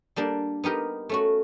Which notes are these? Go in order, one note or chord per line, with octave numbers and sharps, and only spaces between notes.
G3 A#3 D4 G4
B3 D#4 G4 A#4
A3 C#4 F#4